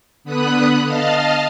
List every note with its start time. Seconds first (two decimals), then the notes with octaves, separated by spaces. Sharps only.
0.24 D3 B3 B5 D#6 F#6
0.83 D#5 F5 A5 F6